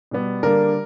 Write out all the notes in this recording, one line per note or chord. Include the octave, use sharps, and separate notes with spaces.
B2 G3 B3
D3 G3 A#3 D4 A#4